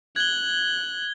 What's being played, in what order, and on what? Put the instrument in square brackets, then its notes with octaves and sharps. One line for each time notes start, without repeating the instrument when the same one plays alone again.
[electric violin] F#6 [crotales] G#6 G7